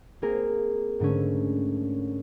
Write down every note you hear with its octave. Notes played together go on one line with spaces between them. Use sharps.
A#3 C4 G#4 A#4
G#2 D3 A3 C#4